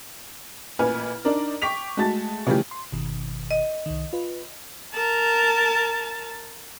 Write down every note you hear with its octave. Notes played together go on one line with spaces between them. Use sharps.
A1 A#2 B4 G#5 F6
D4 D#4 A#4 D5
G5 C#6 D6 B6 F7
G#3 A3 F#4 A5 A6
C#3 E3 F3 G3 A3 G4
C6
G1 B2 D#3
D#5
C2 D#3
F4 B4
A#4 A5